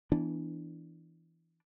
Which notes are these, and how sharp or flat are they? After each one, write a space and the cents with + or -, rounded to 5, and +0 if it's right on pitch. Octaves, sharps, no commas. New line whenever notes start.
E3 +0 B3 -15 D4 +0